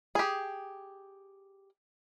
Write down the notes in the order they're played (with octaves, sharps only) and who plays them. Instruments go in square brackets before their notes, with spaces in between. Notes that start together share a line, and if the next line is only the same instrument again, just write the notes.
[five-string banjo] G4 G#4